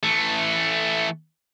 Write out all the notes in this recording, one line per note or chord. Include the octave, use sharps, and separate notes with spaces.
E3 A3